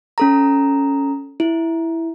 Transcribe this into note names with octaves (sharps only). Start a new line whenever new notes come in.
C#4 A4 A#5
E4